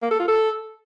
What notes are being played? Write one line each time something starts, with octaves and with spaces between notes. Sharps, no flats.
A#3
A4
F4
A4